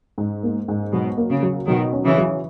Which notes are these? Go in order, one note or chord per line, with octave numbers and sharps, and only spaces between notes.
G#2
A#3
G#2
B2 F#3
A#3
C#3
F#3
B2 D#3 F#3
C#4
C#3 E3
F#3